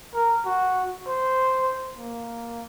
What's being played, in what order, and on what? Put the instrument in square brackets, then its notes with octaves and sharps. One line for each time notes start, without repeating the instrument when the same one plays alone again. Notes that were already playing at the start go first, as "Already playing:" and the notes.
[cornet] A#4
F#4
C5
A#3